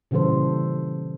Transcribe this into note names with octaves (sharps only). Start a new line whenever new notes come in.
A#2 C#3 E3 G3 A4 C5